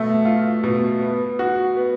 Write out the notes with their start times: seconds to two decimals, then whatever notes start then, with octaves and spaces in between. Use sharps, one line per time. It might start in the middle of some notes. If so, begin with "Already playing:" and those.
Already playing: B2 A3
0.25 F4
0.64 B2
1.02 B3
1.39 F#4
1.77 B3